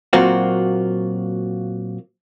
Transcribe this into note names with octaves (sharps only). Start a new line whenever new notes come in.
A#2 F#3 A#3 C4 F4 F#4